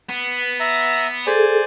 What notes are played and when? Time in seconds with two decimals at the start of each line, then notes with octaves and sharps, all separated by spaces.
0.09 B3
0.60 E5 A#5
1.27 G#4 A4 C5 D5 G#5